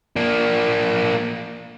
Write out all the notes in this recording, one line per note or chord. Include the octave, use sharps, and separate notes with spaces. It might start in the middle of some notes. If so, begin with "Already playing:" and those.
A#3 D4